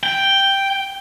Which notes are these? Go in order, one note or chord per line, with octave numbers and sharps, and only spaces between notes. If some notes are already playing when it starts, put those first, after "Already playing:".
G5